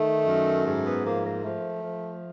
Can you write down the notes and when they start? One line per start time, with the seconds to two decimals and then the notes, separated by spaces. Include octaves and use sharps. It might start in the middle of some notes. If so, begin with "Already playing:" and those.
Already playing: D#3 A3
0.27 F#2
0.65 G#2 A3
0.85 B3
1.04 F3 A#3
1.24 A#3
1.43 F3 A3
1.81 F3